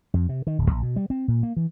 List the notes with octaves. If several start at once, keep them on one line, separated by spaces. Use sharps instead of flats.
F2
C3
D#3
D1
A#1
B2
G3
C4
A#2
A#3
E3